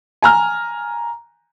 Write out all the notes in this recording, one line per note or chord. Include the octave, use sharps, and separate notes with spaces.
G#5 A#5 F6